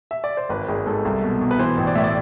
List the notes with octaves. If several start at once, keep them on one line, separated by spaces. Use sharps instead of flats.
E5
D5
C5
G#1 B4
G#1 G#4
G#2 A4
C2
B2
B2
B4
E3 C5
A1
D5
A2 E5
D5